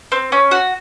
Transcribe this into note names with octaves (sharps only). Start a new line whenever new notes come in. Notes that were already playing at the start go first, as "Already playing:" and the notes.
C4
C#4
F#4